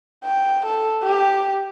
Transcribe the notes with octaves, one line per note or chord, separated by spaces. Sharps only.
G5
A4
G4